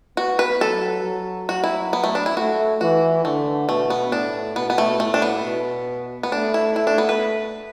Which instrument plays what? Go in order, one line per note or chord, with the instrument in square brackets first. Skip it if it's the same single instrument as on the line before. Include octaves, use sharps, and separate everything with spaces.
[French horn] B3 [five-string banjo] F#4
[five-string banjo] B4
[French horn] F#3 [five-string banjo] A4
[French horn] F#3
[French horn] F#3 [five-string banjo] F#4
[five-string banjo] E4
B3
A3
D4
E4
[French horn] A3 [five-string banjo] F#4
[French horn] E3 [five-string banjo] F#4
[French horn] D3 [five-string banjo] A3
[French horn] B2 [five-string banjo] A3
[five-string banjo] B3
[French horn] A2 [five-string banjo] D4
[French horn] B2 [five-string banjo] B3
[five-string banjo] B3
A3
[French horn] A2 [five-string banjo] A3
[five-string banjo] D4
B3
[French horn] B2
[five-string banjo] B3
[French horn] A3 [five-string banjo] D4
[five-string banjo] E4
E4
D4
B3
B4